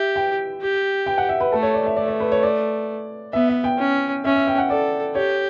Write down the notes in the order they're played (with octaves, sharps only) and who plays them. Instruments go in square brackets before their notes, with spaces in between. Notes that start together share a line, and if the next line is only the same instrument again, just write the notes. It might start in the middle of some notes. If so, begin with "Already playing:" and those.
Already playing: [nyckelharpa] G4 [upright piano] E5
[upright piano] G5
[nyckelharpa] G4
[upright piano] G5
F#5
E5
B4
[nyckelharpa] A3 [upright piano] A4
[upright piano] C#5
D5
E5
[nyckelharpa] A3 [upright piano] D5
[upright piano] D5
B4
C#5
D5
[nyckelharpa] B3 [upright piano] E5
[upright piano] E5
G5
[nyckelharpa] C#4
[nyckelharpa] C#4 [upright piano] E5
[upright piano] E5
G5
F#5
[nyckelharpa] A4 [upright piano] D5
[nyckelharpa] G4 [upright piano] C#5